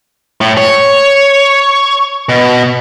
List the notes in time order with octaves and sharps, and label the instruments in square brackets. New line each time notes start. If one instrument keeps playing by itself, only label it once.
[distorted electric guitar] A2
C#5
B2